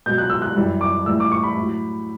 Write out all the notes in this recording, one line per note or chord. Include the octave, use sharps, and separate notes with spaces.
B2 F#3 G6
F#6
E6
F#6
F#2 E3 G3
D6
A2 E3 G3 E6
D6
C#6
B5
A2
F#3